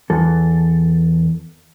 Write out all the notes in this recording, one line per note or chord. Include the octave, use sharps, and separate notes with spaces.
E2 A4